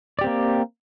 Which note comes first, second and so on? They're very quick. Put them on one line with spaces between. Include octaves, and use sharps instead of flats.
D5 G4 C4 A#3